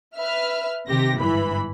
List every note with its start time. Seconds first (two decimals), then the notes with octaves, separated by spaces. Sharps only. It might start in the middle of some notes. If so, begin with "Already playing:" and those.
0.16 B4 E5 F6
0.88 C3 D#3 G4 A#6
1.19 G1 G#2 E3 B5